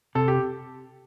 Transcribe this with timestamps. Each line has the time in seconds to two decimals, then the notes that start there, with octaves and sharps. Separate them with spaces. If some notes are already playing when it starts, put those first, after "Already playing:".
0.15 C3 A4
0.28 G4